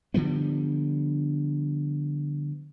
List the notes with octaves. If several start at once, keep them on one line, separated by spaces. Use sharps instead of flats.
D3 F3 G3 B3